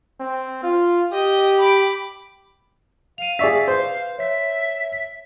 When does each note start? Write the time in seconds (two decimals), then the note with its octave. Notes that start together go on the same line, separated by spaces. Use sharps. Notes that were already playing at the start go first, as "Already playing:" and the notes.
0.20 C4
0.63 F4
1.13 G4 D#5
1.58 B5 D6
3.18 F5 D#7 F7
3.39 G#4 D5 E5 C#6 B6
3.68 B4 C5 F5
4.18 C#5 E5 B6